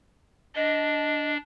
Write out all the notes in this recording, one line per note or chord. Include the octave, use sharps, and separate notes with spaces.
D4 D#5